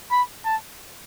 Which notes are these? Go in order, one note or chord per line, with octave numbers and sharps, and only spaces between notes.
B5
A5